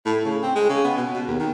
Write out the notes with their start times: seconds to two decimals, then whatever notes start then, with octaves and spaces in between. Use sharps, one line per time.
0.05 A2
0.25 C#3
0.43 C4
0.55 G#3
0.69 C#3
0.84 B3
0.97 B2
1.14 B2
1.27 D#2
1.40 D#3